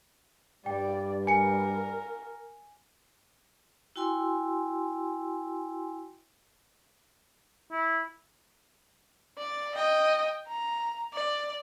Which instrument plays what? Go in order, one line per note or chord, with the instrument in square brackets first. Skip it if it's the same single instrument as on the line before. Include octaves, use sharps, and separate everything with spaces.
[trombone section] G2 G3 [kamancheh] D5 [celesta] G5
[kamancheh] A#4 [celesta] G#5 C#7
[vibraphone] E4 F#4 G5 G#5 C6 E6
[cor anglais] E4
[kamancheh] D5
D#5 G5
A#5
D5